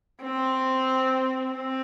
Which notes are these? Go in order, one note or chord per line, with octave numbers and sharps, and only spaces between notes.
C4
C4